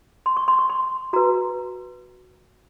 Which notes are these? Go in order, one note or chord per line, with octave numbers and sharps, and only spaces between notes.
C6
C#6
C6
C#6
C6
F#4 B4 A#5